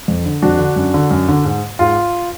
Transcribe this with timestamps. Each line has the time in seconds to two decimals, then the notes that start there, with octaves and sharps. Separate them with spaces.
0.08 F2
0.26 D3
0.42 F2 D4 F#4
0.59 D3
0.76 F#2
0.94 D3
1.11 F#2
1.29 D3
1.45 G#2
1.79 G#2 F4